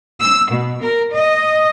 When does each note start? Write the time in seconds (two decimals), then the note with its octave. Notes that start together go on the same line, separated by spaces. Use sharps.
0.21 E6
0.51 B2
0.81 A#4
1.13 D#5